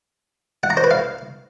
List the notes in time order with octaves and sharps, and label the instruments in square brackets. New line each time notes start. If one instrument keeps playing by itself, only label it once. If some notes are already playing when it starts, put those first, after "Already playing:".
[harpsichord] F#5
A#5
C5
B4
F5